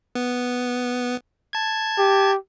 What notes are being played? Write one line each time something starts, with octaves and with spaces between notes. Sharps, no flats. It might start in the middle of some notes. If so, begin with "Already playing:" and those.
B3
A5 G#6
G4